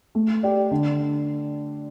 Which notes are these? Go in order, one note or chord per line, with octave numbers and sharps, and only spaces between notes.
A3
G4 D5
D3